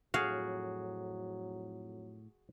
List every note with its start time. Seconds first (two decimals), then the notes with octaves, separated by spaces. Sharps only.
0.14 F2 A2 F#3 F#4 G#4 F5